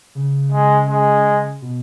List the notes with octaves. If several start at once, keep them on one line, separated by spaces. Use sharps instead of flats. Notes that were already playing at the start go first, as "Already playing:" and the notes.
C#3
G#3
G#3
B2